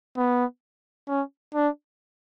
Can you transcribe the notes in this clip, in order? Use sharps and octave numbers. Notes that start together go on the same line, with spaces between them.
B3
C#4
D4